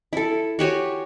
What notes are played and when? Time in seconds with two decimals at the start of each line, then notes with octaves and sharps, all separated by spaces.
0.13 E4 A4
0.59 F#4 G4 C#5 G#5